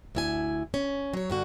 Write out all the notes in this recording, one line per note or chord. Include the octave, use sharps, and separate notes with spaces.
D2 E4 G#5
C#4
F#3 C#5
G2 D3 F#4